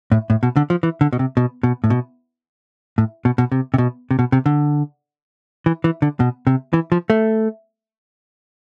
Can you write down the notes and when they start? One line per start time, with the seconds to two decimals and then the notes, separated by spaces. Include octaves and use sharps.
0.12 A2
0.30 A2
0.43 B2
0.56 D3
0.70 F3
0.83 E3
1.01 D3
1.12 B2
1.19 C3
1.37 B2
1.63 B2
1.84 A2
1.90 B2
2.98 A2
3.25 B2
3.38 B2
3.52 C3
3.74 C3
3.78 B2
4.11 C3
4.19 B2
4.32 C3
4.46 D3
5.66 E3
5.84 E3
6.02 D3
6.20 B2
6.47 C3
6.73 E3
6.92 F3
7.10 A3